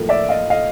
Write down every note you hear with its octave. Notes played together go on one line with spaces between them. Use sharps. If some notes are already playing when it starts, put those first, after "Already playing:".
Already playing: A2 F3 A#3
D5 E5
D#5 F5
D#5 F5